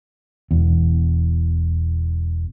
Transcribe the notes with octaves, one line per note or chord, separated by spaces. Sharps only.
E1 E2